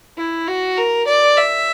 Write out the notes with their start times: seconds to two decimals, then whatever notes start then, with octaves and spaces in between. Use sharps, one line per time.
0.17 E4
0.47 F#4
0.78 A#4
1.07 D5
1.37 E5